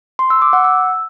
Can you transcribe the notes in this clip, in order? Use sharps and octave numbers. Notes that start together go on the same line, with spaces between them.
C6
E6
D6
F#5
E6